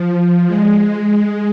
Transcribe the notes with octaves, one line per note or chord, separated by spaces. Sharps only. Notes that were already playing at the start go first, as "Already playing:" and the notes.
Already playing: F3
G#3